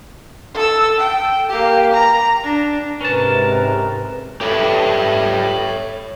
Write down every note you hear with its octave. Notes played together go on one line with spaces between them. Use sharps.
A4 E6
G5
A#3 G4
A#5
D4
G#2 C3 C#4 A#4 B4 A5
G4 A4 B4 C#5 D5 E5